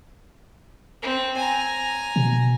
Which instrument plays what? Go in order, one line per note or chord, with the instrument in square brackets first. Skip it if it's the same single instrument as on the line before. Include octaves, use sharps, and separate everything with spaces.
[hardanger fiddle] C4
G#5 A#5
[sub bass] B2